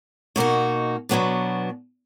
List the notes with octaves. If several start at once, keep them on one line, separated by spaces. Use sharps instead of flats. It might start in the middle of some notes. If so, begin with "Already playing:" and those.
B2 A#3 D#4 F#4
B2 F#3 B3 D4